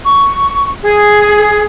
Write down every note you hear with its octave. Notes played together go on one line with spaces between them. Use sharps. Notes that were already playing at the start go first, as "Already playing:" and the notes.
C#6
G#4